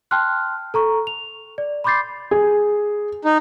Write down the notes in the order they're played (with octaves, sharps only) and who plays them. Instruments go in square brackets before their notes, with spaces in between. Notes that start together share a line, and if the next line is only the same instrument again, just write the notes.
[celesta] G5 A5 C6 F6 F#6
A4 A#5 C#6
F7
D5
B5 C6 D6 G6 A6 C7
[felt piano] G#4
[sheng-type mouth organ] D#4